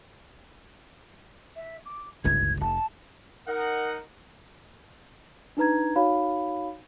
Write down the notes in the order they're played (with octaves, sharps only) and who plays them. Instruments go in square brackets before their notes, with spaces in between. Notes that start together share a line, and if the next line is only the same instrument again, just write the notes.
[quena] E5
D6
[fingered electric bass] D1 G1 C#2 [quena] G#6
[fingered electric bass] F1 [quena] A5
[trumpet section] D#4 F#5 [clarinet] A#4
[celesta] D4 D#4 B4 A#5 G#6
D#4 F#4 C#5 F5 B5